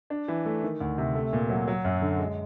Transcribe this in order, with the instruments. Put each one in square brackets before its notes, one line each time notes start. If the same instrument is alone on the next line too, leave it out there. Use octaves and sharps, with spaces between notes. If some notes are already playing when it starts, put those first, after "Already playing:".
[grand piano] D4
E3
A3
D#3
D2
C3
A3
A#2
F#3
F#3
F#2
D3
G#3